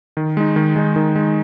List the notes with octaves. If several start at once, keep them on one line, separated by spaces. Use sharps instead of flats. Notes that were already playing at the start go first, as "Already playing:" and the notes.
D#3
G#3 D#4
D#3
G#3 D#4
D#3
G#3 D#4